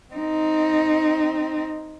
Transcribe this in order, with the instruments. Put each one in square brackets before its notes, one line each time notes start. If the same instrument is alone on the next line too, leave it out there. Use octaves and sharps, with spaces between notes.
[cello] C4 D#4